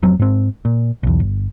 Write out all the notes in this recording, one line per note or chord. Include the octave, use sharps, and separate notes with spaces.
F1 F2 F#3 C4
G#2 C4
A#2
B1 E2
G1